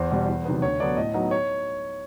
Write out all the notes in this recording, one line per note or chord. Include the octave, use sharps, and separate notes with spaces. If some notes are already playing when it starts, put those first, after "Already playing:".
Already playing: E2 C5
B2 G3
E2
C3 D#3 F#3 B3
D2 C#5
D3 F#3 B3 D5
A2 D#5
F#3 B3 D#4
C#5